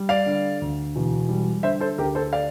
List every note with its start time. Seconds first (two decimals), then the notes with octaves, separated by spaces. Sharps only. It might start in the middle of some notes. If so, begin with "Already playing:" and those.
Already playing: G3
0.09 D5 F5
0.26 D3
0.61 D2
0.96 E1
1.29 G3
1.63 D3 C5 E5
1.80 A4 C5
1.98 D2 G4 A#4
2.15 A4 C5
2.33 D5 F5